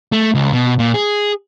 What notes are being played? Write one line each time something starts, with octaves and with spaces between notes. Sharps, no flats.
A3
C#2
B2
A#2
G#4